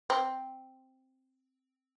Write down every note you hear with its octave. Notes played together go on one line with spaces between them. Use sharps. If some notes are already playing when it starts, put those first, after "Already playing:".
C4